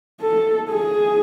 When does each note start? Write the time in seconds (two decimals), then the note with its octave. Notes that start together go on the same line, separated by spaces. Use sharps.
0.21 A4
0.70 G#4